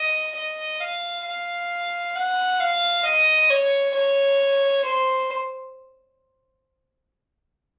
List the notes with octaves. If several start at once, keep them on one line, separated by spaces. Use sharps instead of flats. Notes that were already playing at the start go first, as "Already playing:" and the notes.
Already playing: D#5
D#5
F5
F5
F#5
F5
D#5
C#5
C#5
C5